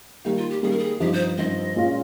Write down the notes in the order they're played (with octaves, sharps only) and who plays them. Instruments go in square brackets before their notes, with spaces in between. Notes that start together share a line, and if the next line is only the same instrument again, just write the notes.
[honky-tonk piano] D#3 G3 A#3 [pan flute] D#4
[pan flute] F4
G4
[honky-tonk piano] D#3 G3 A#3 [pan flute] G#4
[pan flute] A#4
G#4
[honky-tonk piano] G2 F3 C4 D#4 [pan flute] G4
[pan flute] C5
[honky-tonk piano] G2 F3 C4 D#4 [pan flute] D#5
[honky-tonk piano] A#2 G#3 C#4 F4